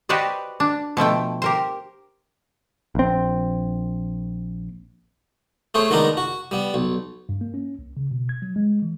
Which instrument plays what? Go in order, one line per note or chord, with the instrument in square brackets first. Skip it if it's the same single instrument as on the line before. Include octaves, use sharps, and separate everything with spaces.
[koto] F#4 G4 B4 C5 D5 D#5
D4
B2 F3 A3 G5
G4 A#4 C5
[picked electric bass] A#1 C4
[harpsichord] A3 G#4 C5 C#5
D#3 G#3 B3 D4 D#4 A#4
F#4
G3 B3
B1
[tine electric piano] G2
A#3
C#4
C2
C#3
B2
G#6
F#3
G#3
E3